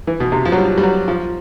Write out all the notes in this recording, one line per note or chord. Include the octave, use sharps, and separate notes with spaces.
E3
B2
C3
F3
F#3
G3
G3
F#3
F3